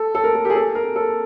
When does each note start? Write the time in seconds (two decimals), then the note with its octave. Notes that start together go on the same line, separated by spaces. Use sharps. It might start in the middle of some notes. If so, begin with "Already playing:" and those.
Already playing: A4
0.15 A4
0.24 A#4
0.35 A4
0.45 G4
0.50 G#4
0.55 A4
0.75 A#4
0.96 A4